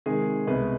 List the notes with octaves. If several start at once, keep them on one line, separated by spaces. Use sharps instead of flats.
C3 D#3 G#3 G#4
C2 B2 G#3 B4